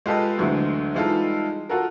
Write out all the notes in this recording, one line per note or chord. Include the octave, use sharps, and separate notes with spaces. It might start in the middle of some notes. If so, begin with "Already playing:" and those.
G#3 F4 G4 A4 B4 D#5
D2 D3 E3 F#3 G#3
E3 G3 G#3 D#4 F4 A4
F4 F#4 A4 A#4